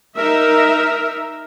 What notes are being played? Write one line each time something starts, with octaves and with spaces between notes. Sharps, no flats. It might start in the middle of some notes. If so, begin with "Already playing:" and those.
D#4 A#4 E5